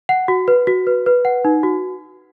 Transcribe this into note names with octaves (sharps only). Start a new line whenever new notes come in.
F#5
F#4
B4
F#4
B4
B4
F#5
D#4
F#4